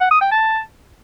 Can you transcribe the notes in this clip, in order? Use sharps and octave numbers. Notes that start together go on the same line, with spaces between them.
F#5
D#6
G5
A5